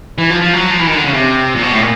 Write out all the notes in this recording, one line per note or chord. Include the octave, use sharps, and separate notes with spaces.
E3
F3
F3
F#3
F3
E3
D#3
D3
C#3
C3
A#2
B2
A2
A#2